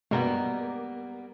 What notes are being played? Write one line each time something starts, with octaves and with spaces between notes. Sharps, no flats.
G2 B2 G3 G#3 A#3 B3